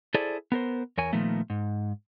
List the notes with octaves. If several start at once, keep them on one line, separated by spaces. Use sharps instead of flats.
E4 G#4 A4 C5 D5
B3 A#4 C5
E2 A#4 C#5 G#5
A#2 D#3 F3 A3 B3
G#2